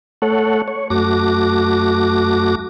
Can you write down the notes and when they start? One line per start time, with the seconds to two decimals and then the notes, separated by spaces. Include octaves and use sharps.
0.22 A3 A4 C#5 F#5
0.68 C#5
0.90 F#2 A3 F#4 D6 A#6